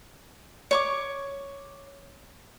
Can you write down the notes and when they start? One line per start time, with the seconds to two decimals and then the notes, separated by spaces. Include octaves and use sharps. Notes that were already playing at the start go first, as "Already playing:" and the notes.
0.71 C#5 C#6 D6